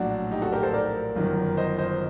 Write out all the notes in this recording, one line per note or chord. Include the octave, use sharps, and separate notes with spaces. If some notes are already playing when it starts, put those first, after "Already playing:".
Already playing: A#1 A2 F#3 D4 F#4
D#4 G4
F#4 A4
G4 A#4
A4 C5
A#4 D5
G1 F#2 D#3
C5 D#5
C5 D#5